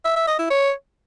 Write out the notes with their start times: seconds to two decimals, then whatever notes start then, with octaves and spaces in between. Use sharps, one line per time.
0.05 E5
0.16 E5
0.28 D#5
0.39 E4
0.50 C#5